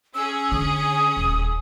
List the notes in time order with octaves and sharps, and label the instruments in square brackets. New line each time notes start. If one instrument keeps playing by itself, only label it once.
[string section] C#4 G#4 [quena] E6
[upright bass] D3 [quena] D#6
[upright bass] D#1